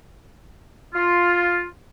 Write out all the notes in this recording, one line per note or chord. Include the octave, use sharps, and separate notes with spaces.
F4